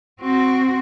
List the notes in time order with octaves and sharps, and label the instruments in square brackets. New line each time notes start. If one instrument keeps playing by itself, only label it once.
[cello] C4 F#4